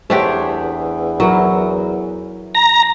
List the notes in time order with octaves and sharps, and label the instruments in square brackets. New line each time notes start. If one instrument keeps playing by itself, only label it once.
[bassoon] E2 [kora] A3 D4 G4 [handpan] C5 C#5
[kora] F#3 [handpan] E4 A#4
[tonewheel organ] A#5